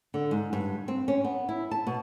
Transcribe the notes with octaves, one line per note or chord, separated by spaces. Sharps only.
D3
G#2
G2
C4
C#4
B3
E4
A5
B2